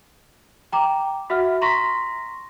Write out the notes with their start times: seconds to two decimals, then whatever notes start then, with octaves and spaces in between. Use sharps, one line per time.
0.72 G5 A#5 D6
1.30 F#4 E5 F#5 F6
1.61 A#5 C6 C#6 A#6 B6